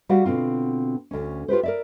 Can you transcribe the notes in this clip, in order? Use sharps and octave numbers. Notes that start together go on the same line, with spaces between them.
G3 F#4 G4 F5 F#5
B2 D3 C4 F4
D2 C#4
F4 G4 B4 C5
A#4 D5 E5